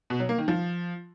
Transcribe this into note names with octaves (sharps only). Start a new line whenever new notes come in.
B2
F#3
A#3
D#3
F3